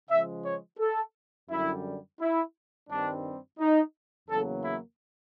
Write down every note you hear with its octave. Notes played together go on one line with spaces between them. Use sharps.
C#3 F3 G#3 E5
C#5
A4
F#2 D3 G3 E4
E4
G2 D#3 G3 C4 D4
D#4
E2 C#3 F#3 A#3 A4
E4